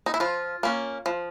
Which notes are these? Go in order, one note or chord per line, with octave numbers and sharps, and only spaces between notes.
D#4
E4
F3 F4
A#3 C#4
F3